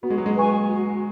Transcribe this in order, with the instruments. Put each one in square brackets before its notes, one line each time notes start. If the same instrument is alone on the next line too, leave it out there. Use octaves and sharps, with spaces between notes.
[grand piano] B3 [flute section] F#4
[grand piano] G#3
F#3
G#3
[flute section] B4 G#5 C#6
F#4